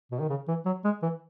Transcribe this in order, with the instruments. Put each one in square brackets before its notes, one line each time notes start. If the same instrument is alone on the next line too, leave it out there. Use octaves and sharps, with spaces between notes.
[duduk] B2
D#3
C#3
E3
F#3
G#3
E3